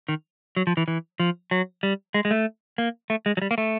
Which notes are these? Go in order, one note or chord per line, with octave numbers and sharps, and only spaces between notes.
D#3
F#3
F3
E3
E3
F3
F#3
G3
G#3
G#3
A3
A#3
A3
G#3
F#3
G3
A#3
A3